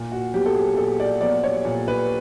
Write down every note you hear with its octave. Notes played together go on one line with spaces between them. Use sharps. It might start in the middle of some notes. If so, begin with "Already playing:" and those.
Already playing: A#2
F#4
F#3 B3 G4
A4
G#4
A#2 A4
D5
F#3 B3 D5
C#5
A#2
B4